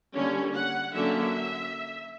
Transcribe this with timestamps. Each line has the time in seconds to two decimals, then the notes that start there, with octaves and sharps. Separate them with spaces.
0.15 D3 G3 A#3 C#4
0.54 F#5
0.93 D3 F#3 A#3 C#4 E5